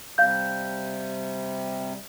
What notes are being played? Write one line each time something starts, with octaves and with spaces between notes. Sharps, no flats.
C3 G3 F5 G6